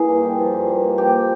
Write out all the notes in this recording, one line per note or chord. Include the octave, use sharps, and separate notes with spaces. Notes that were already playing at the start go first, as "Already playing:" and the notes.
Already playing: E3 A#3 G#4
G2
G3
F3
G2
G2
A#3
F3 G4